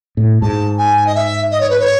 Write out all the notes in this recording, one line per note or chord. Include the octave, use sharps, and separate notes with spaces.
A2
G#2 A5
G#5
D#5
E5
D#5
C#5
B4
C#5